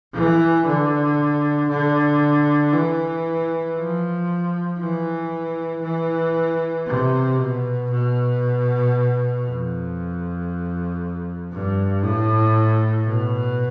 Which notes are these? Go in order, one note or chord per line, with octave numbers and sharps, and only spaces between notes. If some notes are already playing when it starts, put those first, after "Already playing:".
E3
D3
D3
E3
F3
E3
E3
C3
B2
B2
F2
G2
A2
B2